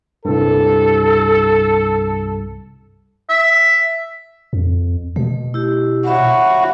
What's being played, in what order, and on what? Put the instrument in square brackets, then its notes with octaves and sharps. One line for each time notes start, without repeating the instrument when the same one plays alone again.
[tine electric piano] C2 G2 [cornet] A4
[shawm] E5
[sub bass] F2
[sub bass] B2 [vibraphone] A3
[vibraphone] E4 G4
[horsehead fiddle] F#4 [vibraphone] C#5 E5 B5